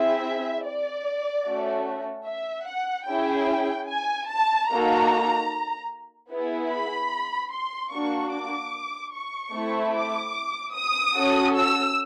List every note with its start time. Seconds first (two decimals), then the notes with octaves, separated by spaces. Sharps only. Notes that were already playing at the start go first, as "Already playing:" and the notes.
Already playing: C4 E4 G#4 E5
0.65 D5
1.46 A3 C#4 F#4 A4
2.26 E5
2.67 F#5
3.07 C#4 E4 G#4 G5
3.88 G#5
4.29 A5
4.69 A#3 D#4 F#4 A4 A#5
6.30 B3 E4 G#4
6.71 B5
7.51 C6
7.92 A#3 D4 F#4 C#6
8.32 D6
9.13 C#6
9.53 A3 C4 E4
9.94 D6
10.74 D#6
11.15 C#4 F#4 A4
11.55 E6